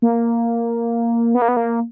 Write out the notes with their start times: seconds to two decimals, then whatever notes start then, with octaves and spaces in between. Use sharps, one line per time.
0.02 A#3
1.35 B3
1.42 A#3
1.48 B3
1.57 A#3